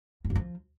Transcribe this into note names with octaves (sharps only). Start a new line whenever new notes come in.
F2
F#2
F3